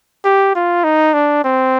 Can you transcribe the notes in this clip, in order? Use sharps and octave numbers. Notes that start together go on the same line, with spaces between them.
G4
F4
D#4
D4
C4